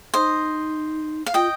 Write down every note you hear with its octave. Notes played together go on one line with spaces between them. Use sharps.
D#4 C5 D#5
F5
F4 D#5 G5